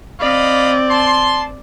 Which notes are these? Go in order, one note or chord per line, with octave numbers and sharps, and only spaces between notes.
C4 D5 D#5 F5 B5
A5 C6